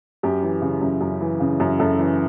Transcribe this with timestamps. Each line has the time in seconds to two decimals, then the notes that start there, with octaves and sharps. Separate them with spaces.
0.23 F#2 G4
0.43 E3
0.62 C#3
0.81 F#2
1.01 F#2
1.21 E3
1.40 C#3
1.60 F#2
1.79 F#2 A4
1.99 E3